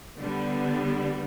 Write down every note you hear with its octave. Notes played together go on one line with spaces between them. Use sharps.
D3 G3 B3